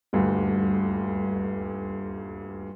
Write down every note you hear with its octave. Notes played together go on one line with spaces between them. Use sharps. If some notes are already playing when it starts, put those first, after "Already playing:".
D#1 D2 G2